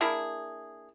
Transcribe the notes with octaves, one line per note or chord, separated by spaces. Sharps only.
A#3 D4 E4 G#4